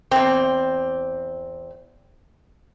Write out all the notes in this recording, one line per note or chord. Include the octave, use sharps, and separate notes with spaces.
E2 C4